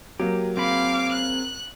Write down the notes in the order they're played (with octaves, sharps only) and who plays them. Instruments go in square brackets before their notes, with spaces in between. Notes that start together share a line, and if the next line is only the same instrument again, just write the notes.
[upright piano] F#3 A#3 [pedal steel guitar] G4
[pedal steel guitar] C4 G#4 B5 [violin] F5 D6
[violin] F#6